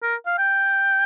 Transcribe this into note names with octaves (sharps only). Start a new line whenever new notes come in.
A#4
F5
G5